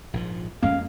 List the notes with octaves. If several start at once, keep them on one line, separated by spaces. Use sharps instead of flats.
A#1 G#2 F3
F2 G#3 A#3 C#4 F5